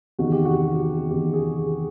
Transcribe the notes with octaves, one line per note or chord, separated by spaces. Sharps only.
E2 C3 D#3 F#4
G4
F#4
E2 C3 D#3 G4
G#4